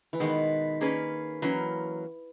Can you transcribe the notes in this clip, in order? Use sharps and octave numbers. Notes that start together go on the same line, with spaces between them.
E3
B2 D#3 G#3 B3
A#3 C#4 G#4 B4
E3 F#3 A#3 C#4